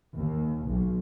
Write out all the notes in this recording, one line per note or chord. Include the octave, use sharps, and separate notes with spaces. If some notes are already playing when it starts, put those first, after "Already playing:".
D#2
B1